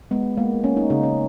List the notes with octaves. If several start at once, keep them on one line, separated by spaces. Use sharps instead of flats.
G#3 B3
G#3 A#3
A#3 C#4
D#4
C#3 D#4
C#4